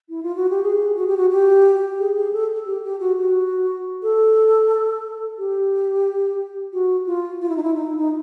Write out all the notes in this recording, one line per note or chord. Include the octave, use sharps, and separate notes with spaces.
E4
F4
F#4
G4
G#4
F#4
G4
F#4
G4
G#4
G#4
A4
G4
G4
F#4
F#4
A4
G4
F#4
F4
F4
E4
D#4
E4
D#4
D#4